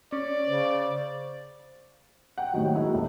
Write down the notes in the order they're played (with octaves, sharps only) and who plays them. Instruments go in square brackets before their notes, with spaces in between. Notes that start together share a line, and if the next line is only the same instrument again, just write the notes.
[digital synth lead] C#4 [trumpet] D5
[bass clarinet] C#3 [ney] C5
[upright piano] F#5 G5
A2 C3 D#3 F#3
G#3 A#3 E4 F#4
D#1